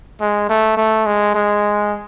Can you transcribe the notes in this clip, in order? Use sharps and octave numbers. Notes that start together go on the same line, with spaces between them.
G#3
A3
A3
G#3
G#3